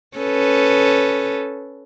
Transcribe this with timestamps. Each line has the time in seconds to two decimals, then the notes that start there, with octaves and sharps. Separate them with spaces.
0.17 C#4 A4 B4